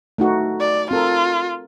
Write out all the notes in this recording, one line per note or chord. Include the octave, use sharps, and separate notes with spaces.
A3 D#4 F#4
D5
C4 F4 A4 A#4